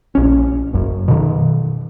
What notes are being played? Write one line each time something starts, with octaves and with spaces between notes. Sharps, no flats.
A#1 C#4
F#1 F#2
B2 D#3